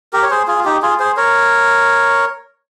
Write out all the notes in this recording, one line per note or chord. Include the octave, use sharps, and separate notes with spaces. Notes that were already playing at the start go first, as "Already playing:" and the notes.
G4 A#4
C#5
G#4 C5
F4 G#4
F4
D#4 G4
F4 G#4
G#4 C5
A#4 C#5